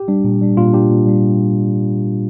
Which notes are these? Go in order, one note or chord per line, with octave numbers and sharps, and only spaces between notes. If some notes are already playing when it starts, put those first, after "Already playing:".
Already playing: G4
G3 D4
A#2
G3 D4
A#2 F4
G3 D4 G4
A#2
G3 D4